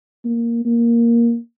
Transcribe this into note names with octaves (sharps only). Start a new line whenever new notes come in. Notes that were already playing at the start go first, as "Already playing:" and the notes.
A#3
A#3